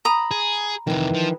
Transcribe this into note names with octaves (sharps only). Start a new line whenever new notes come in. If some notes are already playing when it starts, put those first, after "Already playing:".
A#5 B5 D#6
G#4
F2 C3 D#3 E3
F3